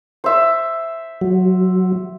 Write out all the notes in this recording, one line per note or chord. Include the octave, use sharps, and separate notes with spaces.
C5 E5
F#3